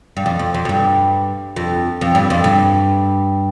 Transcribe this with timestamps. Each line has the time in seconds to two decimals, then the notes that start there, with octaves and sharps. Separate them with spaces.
0.17 G2
0.26 F2
0.39 F2
0.54 F2
0.65 F2
0.69 G2
1.56 F2
2.01 F2
2.15 G2
2.30 F2
2.44 G2